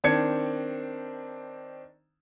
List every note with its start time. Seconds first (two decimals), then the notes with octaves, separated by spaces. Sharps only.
0.04 D#3 C4 D4 G#6 C#7